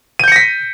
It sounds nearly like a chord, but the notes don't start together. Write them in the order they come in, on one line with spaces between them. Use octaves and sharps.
D#7 G6 C#7 A#6 B6